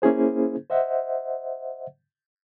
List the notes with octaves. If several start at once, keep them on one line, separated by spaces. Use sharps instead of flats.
A#3 C#4 E4 G#4 C5
C5 D#5 E5 F#5